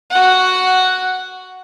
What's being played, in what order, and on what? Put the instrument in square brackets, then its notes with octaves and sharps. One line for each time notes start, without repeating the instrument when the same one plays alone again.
[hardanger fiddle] F#4 F#5